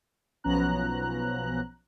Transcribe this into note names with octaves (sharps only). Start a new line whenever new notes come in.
B1 F3 B3 C#4 A#5 F#6